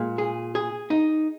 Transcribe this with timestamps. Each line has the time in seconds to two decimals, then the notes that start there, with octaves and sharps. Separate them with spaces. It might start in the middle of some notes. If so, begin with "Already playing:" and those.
Already playing: A#2 G#3
0.18 G#4
0.55 G#4
0.90 D#4